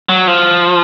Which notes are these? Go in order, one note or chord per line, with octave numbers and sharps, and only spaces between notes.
F#3
F3